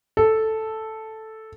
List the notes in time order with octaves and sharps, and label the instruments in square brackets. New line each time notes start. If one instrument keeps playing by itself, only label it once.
[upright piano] A4